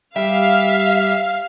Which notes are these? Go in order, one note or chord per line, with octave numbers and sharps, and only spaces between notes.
G3 G4 E5 F5